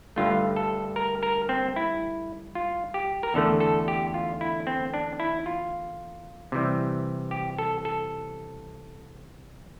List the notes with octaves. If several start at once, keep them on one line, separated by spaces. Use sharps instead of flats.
G2 D3 A3 F4
A4
A#4
A#4
C4
E4
F4
G4
A#4
E2 D3 A3 A4
A4
G4
F4
E4
C4
D4
E4
F4
C3 E3 G3
G4
A4
A4